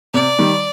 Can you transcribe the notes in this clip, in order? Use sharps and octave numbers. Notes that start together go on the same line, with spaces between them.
C3 D5
D#3 G3